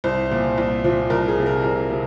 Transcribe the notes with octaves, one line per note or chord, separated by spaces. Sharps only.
C2 C5
A#2 F3
C2
A#2 F3
C2 A#4
G#4
C3 F3
A#4
C2 A#4
C3 F3